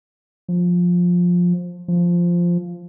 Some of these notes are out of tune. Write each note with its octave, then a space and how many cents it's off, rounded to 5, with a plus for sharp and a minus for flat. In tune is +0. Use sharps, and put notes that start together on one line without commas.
F3 +15
F3 -5